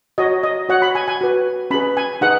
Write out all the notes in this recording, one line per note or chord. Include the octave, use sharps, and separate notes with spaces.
F#4 C#5 D#5
D#5
F#4 C#5 F#5
B5
G#5
G#5
F#4 B4
C#4 G#4 B4 B5
G#5
D#4 G#4 B4 F#5